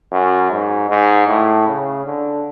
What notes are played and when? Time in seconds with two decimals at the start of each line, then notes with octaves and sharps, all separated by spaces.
0.12 F#2
0.51 G#2
0.90 G#2
1.28 A2
1.67 C#3
2.06 D3